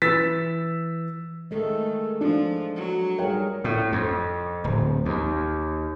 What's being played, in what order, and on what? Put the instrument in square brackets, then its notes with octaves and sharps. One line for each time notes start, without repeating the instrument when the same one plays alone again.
[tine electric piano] E3 [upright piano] E6 A6 B6
[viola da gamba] D#3 A3 [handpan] G#3 A4
[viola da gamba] F3 [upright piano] D4
[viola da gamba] F#3
[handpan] G3 G#4 A#4 [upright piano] C#5 G5
[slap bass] A2
F2
D1
D#2